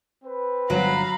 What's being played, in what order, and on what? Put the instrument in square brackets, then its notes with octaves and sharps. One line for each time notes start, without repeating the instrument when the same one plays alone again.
[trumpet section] C4 B4
[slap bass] G1 [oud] F#3 [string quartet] F5 A#5 B5